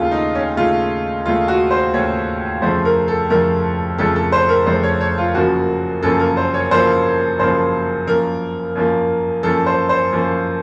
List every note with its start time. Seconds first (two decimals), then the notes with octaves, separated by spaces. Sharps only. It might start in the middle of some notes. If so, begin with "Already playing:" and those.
Already playing: D#2 C#3 A3 F4
0.11 D#4
0.35 C#4
0.57 D#2 C#3 A3 F4
1.25 D#2 C#3 A3 F4
1.48 F#4
1.71 C5
1.94 D#2 C#3 A3 C#5
2.62 F2 C#3 F3 A3 C5
2.85 A#4
3.08 A4
3.30 F2 C#3 F3 A3 A#4
3.98 F2 C#3 F3 A3 A4
4.16 A4
4.32 C5
4.49 A#4
4.66 F2 C#3 F3 A3 C5
4.83 C#5
5.01 C#5
5.18 F4
5.34 F#1 F#2 F3 A#3 F#4
6.03 F#1 F#2 F3 A#3 A4
6.20 A#4
6.37 C5
6.54 C#5
6.71 F#1 F#2 F3 A#3 C5
7.39 F#1 F#2 F3 A#3 C5
8.07 F#2 F3 A#3 A#4
8.75 F#2 F3 A#3
9.43 F#2 F3 A#3 A4
9.66 C5
9.89 C5
10.12 F#2 F3 A#3